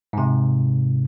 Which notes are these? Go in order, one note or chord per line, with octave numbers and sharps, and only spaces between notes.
G#2 C3